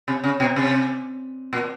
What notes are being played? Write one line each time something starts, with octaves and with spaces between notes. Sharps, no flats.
C3
C#3
B2
C3
A#2